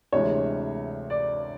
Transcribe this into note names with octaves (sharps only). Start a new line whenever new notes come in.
D2 C3 E3 G#3 C#5
D5